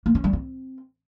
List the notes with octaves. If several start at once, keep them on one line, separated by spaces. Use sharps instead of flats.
A#3
C#4
G3
C4